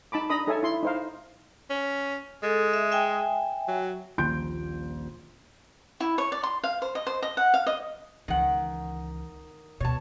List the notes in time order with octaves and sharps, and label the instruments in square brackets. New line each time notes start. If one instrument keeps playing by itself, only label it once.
[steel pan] D#4 A5 B5 D6
D4 D#5 A#5 B5 D#6
D#4 A4 C#5 E5 G#5
E4 C6
D#4 C5 F5
[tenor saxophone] C#4
[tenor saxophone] G#3 [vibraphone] A4
[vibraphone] E5
E5 G5 G#5
[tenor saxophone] F#3
[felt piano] D#1 A#1 C6 G6 D7
[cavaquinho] E4
C#5
D5
C6
F5
C5
D#5
C5
D#5
F#5
F5
D#5
[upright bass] C#2 E3 [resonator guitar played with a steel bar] D#3 F#5
[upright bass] D2 B2 [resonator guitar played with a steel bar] C#5 A5